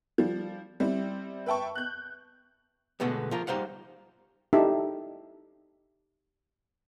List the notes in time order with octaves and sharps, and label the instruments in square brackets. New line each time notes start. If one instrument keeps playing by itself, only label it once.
[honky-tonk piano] F3 G3
G3 C4 E4
B4 E5 G5 A5 C#6
F#6 G6
[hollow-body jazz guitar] B2 D3 G#3 A3 B3
F3 F4 A#4
G3 D#4 C5 F5 F#5
[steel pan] D#4 E4 G4 A4 E5